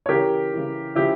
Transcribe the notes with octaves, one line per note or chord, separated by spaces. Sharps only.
C#5
C#3 E3 G4 A#4
C#3 E3
C#3 F3 E4 G4